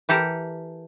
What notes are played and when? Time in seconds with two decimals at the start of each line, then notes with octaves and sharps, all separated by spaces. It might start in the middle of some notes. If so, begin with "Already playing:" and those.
0.09 E3 G4 A4 A#4